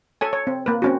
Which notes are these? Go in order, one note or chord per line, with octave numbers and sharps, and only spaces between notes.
A4 C#5 G#5
C#5
C4
A#3 B4
C4 C#4 F#4